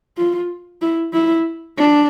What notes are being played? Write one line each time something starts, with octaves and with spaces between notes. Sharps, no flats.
F4
E4
E4
D4